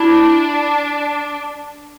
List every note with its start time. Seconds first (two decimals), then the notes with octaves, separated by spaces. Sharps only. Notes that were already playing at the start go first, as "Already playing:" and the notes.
Already playing: D4 E4